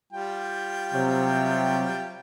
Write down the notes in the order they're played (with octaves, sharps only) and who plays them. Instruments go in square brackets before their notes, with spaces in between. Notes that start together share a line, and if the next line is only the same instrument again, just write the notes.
[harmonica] G3 F4 G5
[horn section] C3 F#3